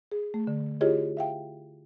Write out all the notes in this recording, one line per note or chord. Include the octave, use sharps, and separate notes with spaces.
G#4
A3
D3
E4 F4 G4 G#4 C#5 D#5
E5 F5 G5